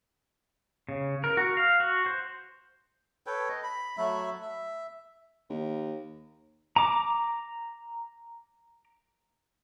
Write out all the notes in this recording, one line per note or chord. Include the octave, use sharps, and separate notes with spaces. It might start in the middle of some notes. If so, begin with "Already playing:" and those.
C#3
A#4
F#4
F5
F#4
C5
A4 B4 C#5 G5
D#5
B5
F#3 A3 E5 B5
E5
D#2
A#5 D6